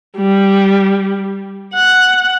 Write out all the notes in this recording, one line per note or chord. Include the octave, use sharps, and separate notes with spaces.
G3
F#5